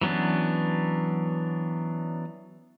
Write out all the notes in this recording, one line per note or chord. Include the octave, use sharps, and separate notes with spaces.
E3 F#3 B3 C#4 D4